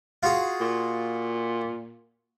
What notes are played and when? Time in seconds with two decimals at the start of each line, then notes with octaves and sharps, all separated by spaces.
0.23 F4 F#4 G#4
0.61 A#2